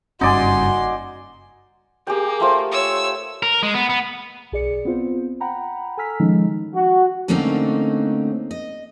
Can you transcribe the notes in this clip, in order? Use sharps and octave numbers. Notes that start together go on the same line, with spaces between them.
F#1 G2 C#4 D#4 F#4 D5 G#5 C6
A#3 G4 G#4 G5
A3 F4 C5
C#5 E6
A#4
G#3
B3
B3
B1 G#4 D5 C#7
B3 C4 F4 C5
F#5 G5 A#5 B5
A4 G#5 A#5 E6 F6 B6
D#3 F3 G#3 C#4 D#4
F#4
D3 A3 A#3 C4 C#4 D#4
D#5